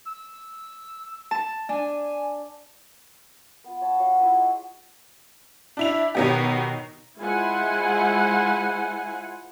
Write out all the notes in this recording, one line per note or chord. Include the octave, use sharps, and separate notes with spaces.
E6
A5
D4 G#5
B3 F4
C#5 F5 A5 B5
F#4 C#5 F5
E4 F4 B4
G#3
D4 E4 F7
B2 D#3 F#3 B3 G4
G#3 E4 F4 C5 F#5 G#5